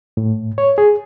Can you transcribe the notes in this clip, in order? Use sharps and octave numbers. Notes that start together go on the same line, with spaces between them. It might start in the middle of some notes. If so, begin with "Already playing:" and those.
A2
C#5
G#4